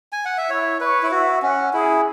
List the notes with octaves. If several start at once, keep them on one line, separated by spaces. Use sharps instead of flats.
G#5
F#5
E5
E4 C#5
B4 C#5
E4
F#4 E5
C#4 F#5
E4 G#4